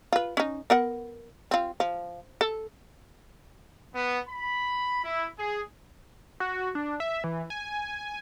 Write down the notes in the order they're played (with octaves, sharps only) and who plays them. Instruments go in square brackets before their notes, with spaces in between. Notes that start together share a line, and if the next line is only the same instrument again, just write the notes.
[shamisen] F4 B4
C#4 D#4
B3 A#4 F#5
C4 F4
F3
A4
[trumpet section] B3
B5
E4
G#4
[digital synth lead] F#4
D4
E5
E3
G#5